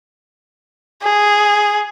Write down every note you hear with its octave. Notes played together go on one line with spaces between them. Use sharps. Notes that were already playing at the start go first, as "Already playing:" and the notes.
G#4